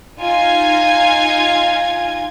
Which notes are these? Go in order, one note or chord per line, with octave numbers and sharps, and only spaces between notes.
D#4 F4 G#5 G#6